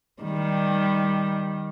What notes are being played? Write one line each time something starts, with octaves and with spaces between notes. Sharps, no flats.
D#3 G3